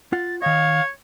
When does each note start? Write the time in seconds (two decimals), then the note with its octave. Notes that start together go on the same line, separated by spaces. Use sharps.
0.13 F4 F#5 A6
0.42 D#3 C#5 D#5 F5